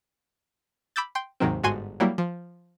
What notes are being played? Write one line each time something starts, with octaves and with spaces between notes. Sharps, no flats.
B5 D6 E6 G6 A6
G5 C6
D#2 G#2 C3 D#3 F#3 C4
G1 G#2 F#4 G#5 C6 D#7
F#3 G3 A#3 E4
F3